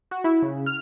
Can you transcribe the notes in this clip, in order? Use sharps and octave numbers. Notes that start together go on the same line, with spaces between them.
F#4
E4
C#3
F6